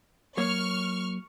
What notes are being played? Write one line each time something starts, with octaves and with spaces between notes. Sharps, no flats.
F#3 A#3 C#5 C#6 F6